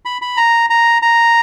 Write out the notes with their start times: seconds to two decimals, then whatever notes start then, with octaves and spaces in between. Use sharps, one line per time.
0.05 B5
0.22 B5
0.37 A#5
0.70 A#5
1.02 A#5